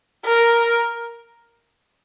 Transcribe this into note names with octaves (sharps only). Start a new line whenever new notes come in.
A#4